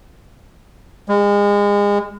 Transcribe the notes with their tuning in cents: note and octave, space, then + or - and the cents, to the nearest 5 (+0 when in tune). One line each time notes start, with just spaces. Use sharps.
G#3 -30